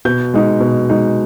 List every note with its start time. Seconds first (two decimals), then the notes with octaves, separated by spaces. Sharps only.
0.05 B2 G6
0.34 G#3 D#4
0.60 B2
0.89 G#3 D#4